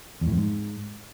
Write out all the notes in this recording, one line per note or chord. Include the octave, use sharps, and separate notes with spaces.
E2
A2
F2
G#2